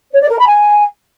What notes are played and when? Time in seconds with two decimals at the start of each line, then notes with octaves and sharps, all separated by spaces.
0.12 C#5
0.20 D5
0.29 A#4
0.38 B5
0.46 G#5